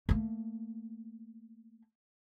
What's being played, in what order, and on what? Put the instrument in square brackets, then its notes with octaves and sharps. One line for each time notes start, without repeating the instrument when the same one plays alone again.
[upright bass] A3 A#3